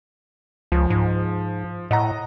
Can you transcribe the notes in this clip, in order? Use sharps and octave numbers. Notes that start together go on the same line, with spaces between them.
C#2 F3
G#2
A2 D#5 F#5 A#5